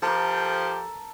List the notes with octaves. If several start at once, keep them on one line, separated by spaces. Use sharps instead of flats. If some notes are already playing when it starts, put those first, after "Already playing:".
F3 G4 A4 A#4